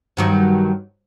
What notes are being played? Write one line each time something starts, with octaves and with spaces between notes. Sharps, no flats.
G2 D#3 F#3